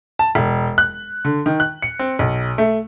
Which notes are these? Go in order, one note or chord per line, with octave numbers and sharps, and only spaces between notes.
A5
E1
F#6
D3
D#3
F#6
C#7
C4
B1
A3